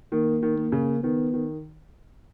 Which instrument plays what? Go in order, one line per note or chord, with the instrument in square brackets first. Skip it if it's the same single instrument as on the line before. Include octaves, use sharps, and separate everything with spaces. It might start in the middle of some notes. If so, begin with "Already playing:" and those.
[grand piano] D#3 [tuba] A#3
[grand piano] D#3
[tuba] A#3
[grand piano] C#3
[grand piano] D#3 [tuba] B3
[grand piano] D#3